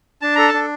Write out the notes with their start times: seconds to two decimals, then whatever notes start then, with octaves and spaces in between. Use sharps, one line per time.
0.22 D4 A5
0.36 A4 A#5
0.48 A5
0.54 D4